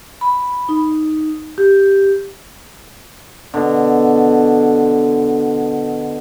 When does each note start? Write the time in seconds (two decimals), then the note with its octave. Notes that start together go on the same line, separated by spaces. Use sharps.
0.21 B5
0.69 D#4
1.58 G4
3.54 B2 D3